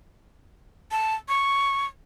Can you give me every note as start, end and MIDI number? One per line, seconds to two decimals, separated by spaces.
0.91 1.15 81
1.29 1.86 85